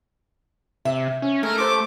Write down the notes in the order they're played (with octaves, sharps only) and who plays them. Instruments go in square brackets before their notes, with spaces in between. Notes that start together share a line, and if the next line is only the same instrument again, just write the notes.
[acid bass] C3 [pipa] E5
[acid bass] C#4
[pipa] G#3 [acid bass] A3 [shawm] A#4
[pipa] G4 C5 [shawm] D6